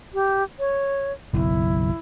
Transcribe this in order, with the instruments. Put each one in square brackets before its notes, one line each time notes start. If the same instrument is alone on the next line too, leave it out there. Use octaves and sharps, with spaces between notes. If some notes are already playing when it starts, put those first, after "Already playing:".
[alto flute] G4
C#5
[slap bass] F#1 B1 F#2 [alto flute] E4